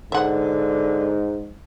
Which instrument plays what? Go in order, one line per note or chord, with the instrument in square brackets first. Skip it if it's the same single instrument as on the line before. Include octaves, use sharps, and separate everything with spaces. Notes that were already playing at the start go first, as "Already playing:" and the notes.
[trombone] G#2 [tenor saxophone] D3 [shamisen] E5 F#5